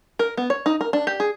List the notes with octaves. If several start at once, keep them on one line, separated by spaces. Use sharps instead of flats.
A#4
B3
C#5
D#4
A#4
D4
G4
G#4